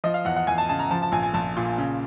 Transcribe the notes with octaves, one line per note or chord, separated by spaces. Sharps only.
F3 D#5
F5
E2 F#5
F#5
E2 G#5
A5
C#3 A5
A#5
F3 A5
A5
A#1 G#5
G#5
A#1 A5
A#2
C#3